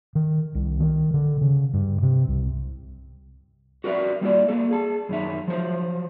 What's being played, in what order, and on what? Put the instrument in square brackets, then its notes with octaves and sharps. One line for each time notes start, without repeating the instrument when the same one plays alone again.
[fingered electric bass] D#3
C2
D#3
D3
C#3
G2
C3
C2
[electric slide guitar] F#4 A#4 D5 E5
G3 A#3 E4 D5
A#3 A4
G#4 A5
F#2 D#3 E5
F3 F#3 C5